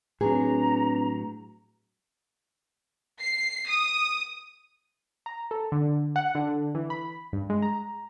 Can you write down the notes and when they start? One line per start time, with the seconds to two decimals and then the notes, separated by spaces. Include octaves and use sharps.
0.21 A2 F#3 C4 D4 G#4 B4 A#5
3.21 C7
3.68 D#6
5.26 A#5
5.51 A4
5.72 D3
6.16 F#5
6.35 D3
6.75 E3
6.90 B5
7.33 G2
7.50 G#3
7.62 A#5